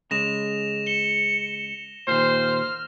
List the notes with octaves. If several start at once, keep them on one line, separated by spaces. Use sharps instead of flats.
C#3 G#3 A#6 E7 F7
C#7 E7 G7
D#2 A#2 C5 F6